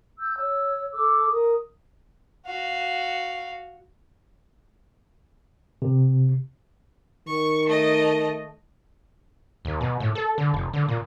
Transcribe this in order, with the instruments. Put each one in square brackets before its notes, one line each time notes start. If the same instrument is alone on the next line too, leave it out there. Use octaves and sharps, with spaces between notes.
[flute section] E6 G6
C#5 E6
A4 D6 E6
A#4 D#6
[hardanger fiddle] F#4 F5
[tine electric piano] C3
[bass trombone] D#3 [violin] C#6
[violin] A3 D#5
[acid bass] D#2
B2
A2
A4
D3
F1
D3
A#2